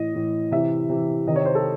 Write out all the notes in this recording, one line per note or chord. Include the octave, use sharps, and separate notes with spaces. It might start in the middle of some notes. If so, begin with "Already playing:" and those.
Already playing: A2 E3 D#5
A2 E3
C3 E3 E5
C3 E3
C3 D#3 D#5
C#5
C5
A4